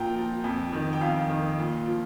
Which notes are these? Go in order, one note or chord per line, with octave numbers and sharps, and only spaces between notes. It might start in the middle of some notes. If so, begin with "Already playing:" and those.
Already playing: A#2 F3 G5 A#5
F3
F2
D#3
G5
F2 F5
D#3
A#2
F3